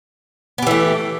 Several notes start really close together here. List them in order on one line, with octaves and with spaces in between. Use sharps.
B3 G4 E3 A3